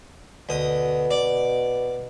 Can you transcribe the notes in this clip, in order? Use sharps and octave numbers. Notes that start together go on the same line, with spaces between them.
D2 B2 D#6
D5